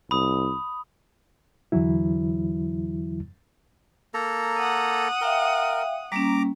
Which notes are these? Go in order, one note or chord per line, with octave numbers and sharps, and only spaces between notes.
C2 B5 D#6
E2 D3 E3 F#3 E4
A#3 A4 A#5
F#5 D#6
A#4 E5 F5 G5
G3 A#3 C#4 A#5 D6